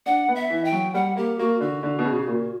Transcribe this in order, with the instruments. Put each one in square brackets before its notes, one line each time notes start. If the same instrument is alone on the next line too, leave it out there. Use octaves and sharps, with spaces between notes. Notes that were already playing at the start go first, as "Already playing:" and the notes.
[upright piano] D4 [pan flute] F#5
[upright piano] B3
[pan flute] E5
[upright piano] E3
[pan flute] G5
[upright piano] F#3
[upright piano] G3 [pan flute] F#5
[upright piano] A#3 [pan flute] G4
[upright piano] A#3 [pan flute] F#4
[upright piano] D3 [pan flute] F#4
[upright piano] D3
B2
C#3
A#2